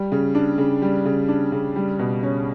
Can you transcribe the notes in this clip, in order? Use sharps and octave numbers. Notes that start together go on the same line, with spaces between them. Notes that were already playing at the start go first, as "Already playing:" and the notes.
Already playing: G3
C#3
D4
C#3
G3
C#3
D4
C#3
G3
B2
C#4